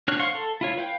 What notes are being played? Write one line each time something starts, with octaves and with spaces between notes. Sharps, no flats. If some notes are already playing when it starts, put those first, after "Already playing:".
D4 F#4 C#5 F6 F#6
C5 F5 F#5 C6 C#6
A4
E4 F4 C#5
B4 F5 G5